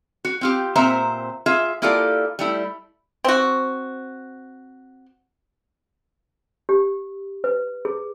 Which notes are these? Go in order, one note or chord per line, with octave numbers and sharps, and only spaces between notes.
F#4
C4 F4 G4
A#2 C4 C5 E5 A#5
F4 G#4 E5
A#3 E4 F4 G4 A4 D5
G3 A3 E4
C4 F#4
G4
B4
G#4